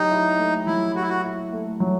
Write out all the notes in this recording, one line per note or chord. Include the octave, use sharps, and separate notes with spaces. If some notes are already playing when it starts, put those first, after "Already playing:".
Already playing: F#3 A3 D#4 G4
E4
A3
F#3 E4
F#4 G4
E4
F#4
E4
A3
F#3